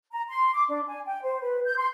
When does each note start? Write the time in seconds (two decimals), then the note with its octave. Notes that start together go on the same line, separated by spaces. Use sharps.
0.12 A#5
0.28 C6
0.54 D6
0.69 D4
0.88 G#5
1.06 G5
1.23 C5
1.42 B4
1.65 G6
1.77 C6